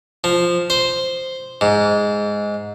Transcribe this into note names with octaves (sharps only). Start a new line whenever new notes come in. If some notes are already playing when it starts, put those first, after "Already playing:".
F3
C5
G#2